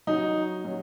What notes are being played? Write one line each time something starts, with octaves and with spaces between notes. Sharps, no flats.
F#3 C#4 D#4 F#4
F#3 C#4 F#4